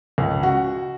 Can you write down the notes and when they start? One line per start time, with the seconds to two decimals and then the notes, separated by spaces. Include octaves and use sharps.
0.18 C#2
0.43 F#4